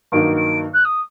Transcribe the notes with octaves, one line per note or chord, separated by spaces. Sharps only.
G2 D#3 F#3 A#3 D#4 D7
D7
F#6
D#6